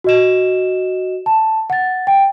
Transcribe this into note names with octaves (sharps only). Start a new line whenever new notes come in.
F#4 D#5 E7
A5
F#5 A6
G5